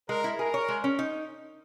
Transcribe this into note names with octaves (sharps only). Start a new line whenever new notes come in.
G#3 A#4
E4
G#4 A#4
C#5
G#3
C#4
D#4